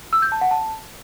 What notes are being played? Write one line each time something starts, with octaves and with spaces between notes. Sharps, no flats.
E6
G6
A5
F#5
A5